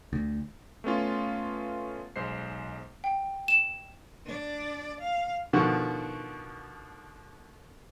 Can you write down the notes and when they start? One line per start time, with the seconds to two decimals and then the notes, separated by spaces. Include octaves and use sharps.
0.13 D2
0.84 A3 B3 C#4 F4
2.16 B1 G#3 C5 C7
3.04 G5
3.48 E7
4.25 D4 D5
5.01 F5
5.53 B2 D3 D#3 F3 F#4